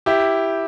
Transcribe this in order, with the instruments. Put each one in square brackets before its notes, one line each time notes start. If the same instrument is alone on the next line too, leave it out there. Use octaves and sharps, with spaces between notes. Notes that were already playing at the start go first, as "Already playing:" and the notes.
[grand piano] E4 G4